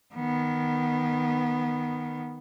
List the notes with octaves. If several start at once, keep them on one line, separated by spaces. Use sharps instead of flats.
D#3 B3